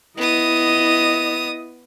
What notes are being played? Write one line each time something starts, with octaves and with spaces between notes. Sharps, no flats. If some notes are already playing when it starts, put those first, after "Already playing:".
B3 E4 D#5 D#6